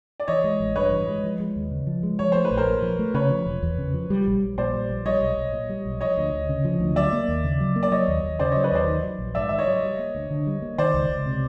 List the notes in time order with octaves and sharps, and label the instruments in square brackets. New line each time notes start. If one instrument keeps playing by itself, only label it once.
[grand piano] D5
[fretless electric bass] E3 [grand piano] C#5 D#5
[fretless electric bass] G#3
A1
[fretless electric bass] G2 [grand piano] B4 C#5
[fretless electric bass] E3
G#3
F3
G#3
D#2
C#3
F3
G#3
[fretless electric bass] F3 [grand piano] C#5
[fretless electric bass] A3 [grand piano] C5
[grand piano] B4
[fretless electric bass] A#1
[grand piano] A#4 C5
[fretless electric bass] A#2
F3
A3
[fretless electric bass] C#3 [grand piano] B4 C#5
[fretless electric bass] F3
E1
E2
C#3
F3
G3
A#1
A#1
[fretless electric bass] A#2 [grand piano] C5 D5
[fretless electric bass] G3
A#1
[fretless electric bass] G3 [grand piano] C#5 D#5
[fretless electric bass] B1
B1
A#2
G3
B1
[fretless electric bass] F3 [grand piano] C#5 D#5
[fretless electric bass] D2
D2
C#3
F3
D2
[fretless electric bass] F#3 [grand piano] D5 E5
[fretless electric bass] A#3
D#2
C#3
F#3
A#3
[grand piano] D5
[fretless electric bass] F#3 [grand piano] C#5 D#5
[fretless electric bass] D#2
D#2
[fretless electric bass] C#3 [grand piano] C5 D5
[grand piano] C#5 D#5
[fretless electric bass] F#3
[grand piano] B4 C#5
[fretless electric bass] D#2 [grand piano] C5 D5
[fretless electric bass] D#3
F#3
A#1
[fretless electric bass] G#2 [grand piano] D5 E5
[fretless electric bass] D#3 [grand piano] E5
[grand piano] C#5 D#5
[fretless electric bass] F#3
G3
A#3
D2
D3
G3
A#3
[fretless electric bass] D#3 [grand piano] C5 D5
[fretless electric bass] C#2
C#2
C3